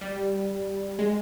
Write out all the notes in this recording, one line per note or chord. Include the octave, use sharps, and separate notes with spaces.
G3
G#3